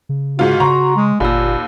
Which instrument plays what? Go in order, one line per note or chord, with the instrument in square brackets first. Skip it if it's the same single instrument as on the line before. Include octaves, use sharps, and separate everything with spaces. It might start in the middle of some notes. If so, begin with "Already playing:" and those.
[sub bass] C#3
[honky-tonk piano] G#2 F4 [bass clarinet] F#4
[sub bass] C#3 [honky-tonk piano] A#5 [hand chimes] C6 C#6
[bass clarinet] G#3
[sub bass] G1 [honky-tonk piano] D#2 [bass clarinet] A#2 [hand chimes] B5 E6